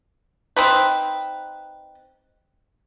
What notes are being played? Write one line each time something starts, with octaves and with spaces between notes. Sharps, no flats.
C4 D#4 B4